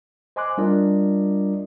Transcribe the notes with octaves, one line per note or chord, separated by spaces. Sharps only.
C5 D#5 G#5 C6 D6 F#6
G3 D4 F4 A#4 D5 D#5